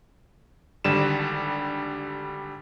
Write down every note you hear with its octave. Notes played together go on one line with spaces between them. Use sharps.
G#1 D3 G3 E7